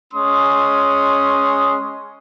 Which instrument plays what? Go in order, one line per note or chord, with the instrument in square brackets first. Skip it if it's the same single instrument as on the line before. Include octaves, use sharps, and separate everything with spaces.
[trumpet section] G#3 C#4 C6 D#6